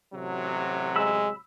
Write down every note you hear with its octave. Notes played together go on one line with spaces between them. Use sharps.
A1 C3 F#3
G#3 B5 E6